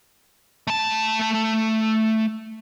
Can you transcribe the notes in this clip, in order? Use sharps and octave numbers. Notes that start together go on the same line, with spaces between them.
A3 A5